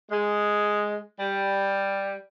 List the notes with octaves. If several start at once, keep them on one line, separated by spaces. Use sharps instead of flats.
G#3
G3